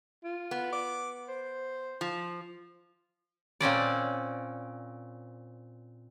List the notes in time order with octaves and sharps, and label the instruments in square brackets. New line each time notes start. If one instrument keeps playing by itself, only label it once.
[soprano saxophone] F4
[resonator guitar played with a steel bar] B3
[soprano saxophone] D6
C5
[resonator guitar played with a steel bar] F3
[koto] A#2 C4 C#4 D5